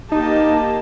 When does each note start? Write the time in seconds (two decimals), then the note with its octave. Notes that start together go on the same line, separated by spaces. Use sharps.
0.12 A#3 D#4 G4 D#5 A5